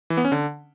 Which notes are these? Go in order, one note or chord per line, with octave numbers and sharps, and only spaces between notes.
E3
B3
C#4
D3